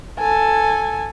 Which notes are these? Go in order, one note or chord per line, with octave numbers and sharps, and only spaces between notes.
A4 G#5